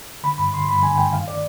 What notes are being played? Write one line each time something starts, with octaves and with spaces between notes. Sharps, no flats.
D3 B5
G2 B5
D3 C6
G2 B5
D3 G#5
G2 G5
D#3 F5
D5